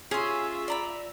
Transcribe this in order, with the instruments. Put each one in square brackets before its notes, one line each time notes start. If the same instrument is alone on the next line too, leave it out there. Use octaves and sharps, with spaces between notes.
[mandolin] C#4 C6 [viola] F4 E5 [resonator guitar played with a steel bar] G#4
[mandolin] D5 A#5 B5